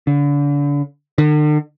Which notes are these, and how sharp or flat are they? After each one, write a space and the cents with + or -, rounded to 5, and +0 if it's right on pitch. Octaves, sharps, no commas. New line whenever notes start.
D3 -35
D3 +45